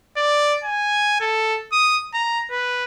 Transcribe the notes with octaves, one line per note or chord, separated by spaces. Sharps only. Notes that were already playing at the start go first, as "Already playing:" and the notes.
D5
G#5
A4
D#6
A#5
B4